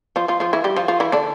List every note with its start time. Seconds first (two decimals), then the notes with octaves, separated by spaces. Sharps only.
0.16 F3 F4
0.28 F3 F4
0.40 F3 F4
0.53 E3 E4
0.64 G3 G4
0.76 F3 F4
0.88 F3 F4
1.00 E3 E4
1.12 D3 D4